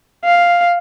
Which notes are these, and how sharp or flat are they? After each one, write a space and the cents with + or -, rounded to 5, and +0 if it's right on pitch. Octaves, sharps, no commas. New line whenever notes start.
F5 +0